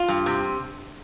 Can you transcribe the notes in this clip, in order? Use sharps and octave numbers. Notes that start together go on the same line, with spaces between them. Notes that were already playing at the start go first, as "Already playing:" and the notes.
Already playing: F4
G2
C3